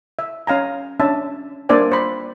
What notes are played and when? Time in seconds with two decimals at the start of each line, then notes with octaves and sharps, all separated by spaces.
0.19 E5
0.47 C#4 F5 G#5 A#5
1.00 C#4 D4 E5 A5
1.69 A#3 D4 C5 D5 E5 G#5
1.92 C5 B5